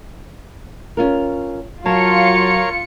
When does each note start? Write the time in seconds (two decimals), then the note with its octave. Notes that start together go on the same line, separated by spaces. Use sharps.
0.97 C#4 F4 A#4
1.86 F#3 F4 A#4 C#5 F5 A5 C#7